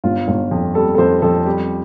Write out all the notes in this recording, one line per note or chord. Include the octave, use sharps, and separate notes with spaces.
G1 F4
G1
F2
G3 A4
A4
F2 C5
F2 A4
G3 G4